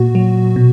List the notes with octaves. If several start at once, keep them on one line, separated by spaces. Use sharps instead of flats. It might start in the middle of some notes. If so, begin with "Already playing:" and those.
Already playing: A#2 F#4
F#3
B2